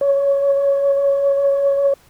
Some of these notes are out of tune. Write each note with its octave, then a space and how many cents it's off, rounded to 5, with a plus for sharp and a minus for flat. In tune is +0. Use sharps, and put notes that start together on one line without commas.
C#5 +10